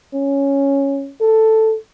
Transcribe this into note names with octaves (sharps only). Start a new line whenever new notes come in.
C#4
A4